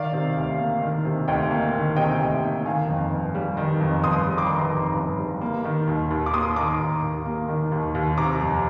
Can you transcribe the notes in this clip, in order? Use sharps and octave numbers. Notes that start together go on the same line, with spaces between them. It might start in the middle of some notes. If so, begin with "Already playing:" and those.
Already playing: D#3 D5 F5
C3
D2
A#3
D#3
C3
D2 D#5 G5
A#3
D#3
C3 D#5 G5
D2
A#3
D#3 F5 G#5
F2
G1
G3
D#3
F2
G1 C6 D#6
G3
D6
C6
D#3 A#5 D6
F2
G1
G3
A#3
D#3
D#2
D#2
D6
A#3 C6 D#6
D#3 A#5 D6
D#2
D#2
A#3
D#3
D#2
D#2
C3 A#5 D6
F2